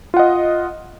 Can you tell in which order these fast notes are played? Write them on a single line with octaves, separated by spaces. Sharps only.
F4 F#5 D#5